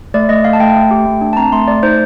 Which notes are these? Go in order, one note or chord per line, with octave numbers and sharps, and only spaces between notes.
A3 D5
A3 D#5
A3 F5
A5
A3 G5
A3
G4
A3
D4
A5
C4 A#5
A3 C6
A3 D5
D#4 C5